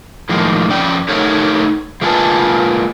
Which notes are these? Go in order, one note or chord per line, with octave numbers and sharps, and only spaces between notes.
A2 D#3 F3 G#3 A#3
F2 C#4 D5 G5
A3 D#4 G4 A4 A#4 C#5
G#3 A#3 F4 B4 G#5 A5